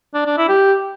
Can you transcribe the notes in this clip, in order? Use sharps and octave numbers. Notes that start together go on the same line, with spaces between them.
D4
D4
E4
G4